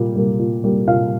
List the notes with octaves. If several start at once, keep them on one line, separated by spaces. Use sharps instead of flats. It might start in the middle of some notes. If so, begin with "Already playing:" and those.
Already playing: A#2 G3 A#3
G3 A#3
A#2
G3 A#3
A#2 F5